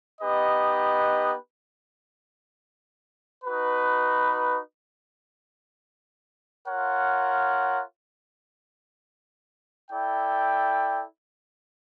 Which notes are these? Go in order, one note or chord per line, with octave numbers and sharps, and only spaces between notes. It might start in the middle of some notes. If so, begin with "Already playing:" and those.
B3 D#4 G4 B4 D#5
D#4 F#4 B4
F4 A#4 C#5 F#5
E4 A4 D5 G5